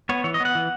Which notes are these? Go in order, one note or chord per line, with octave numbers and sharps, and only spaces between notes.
B3 C#5
E3 C#5
D#5
B3
F#5
E3